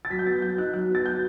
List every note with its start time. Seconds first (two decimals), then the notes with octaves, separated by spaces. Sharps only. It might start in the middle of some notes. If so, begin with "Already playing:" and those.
0.05 A6
0.10 F#3 B6
0.19 G6
0.25 B3 A6
0.41 F#3 G6
0.58 D#4 F#6
0.74 F#3 F#6
0.90 B3 A6
1.05 F#3 G6